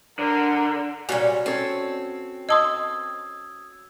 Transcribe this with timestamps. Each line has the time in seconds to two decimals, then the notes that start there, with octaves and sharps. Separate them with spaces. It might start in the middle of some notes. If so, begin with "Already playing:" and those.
0.19 D3 A#4
1.09 A#2 D#3 G3 F#4 C#5 G#5
1.46 C4 C#4 A4 C#5
2.49 D#5 A5 C6 D#6 E6 G#6